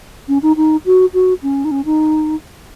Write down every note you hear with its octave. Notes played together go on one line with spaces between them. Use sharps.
C#4
D#4
D#4
F#4
F#4
C#4
D#4
C#4
D#4